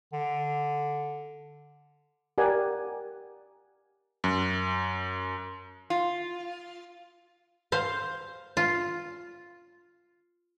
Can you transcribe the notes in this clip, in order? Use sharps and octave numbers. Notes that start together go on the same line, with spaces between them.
D3
G4 A#4 D5 F#5 G#5
F#2
F4
C5 F5
F4